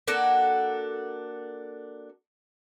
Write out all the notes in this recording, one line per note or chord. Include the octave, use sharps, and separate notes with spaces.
A#3 D4 F#4 A4